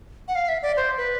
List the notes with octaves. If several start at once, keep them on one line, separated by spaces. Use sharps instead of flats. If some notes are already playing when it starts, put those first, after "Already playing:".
F#5
F5
E5
D5
C5
B4